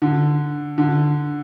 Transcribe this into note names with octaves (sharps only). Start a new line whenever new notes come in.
D3
D3